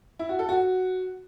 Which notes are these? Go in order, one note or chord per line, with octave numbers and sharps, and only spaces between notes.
E4
F#4
A4
F#4